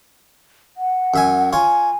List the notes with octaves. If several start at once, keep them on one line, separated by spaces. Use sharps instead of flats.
F#5
F#2 E5 G#5
F4 C#5 G#5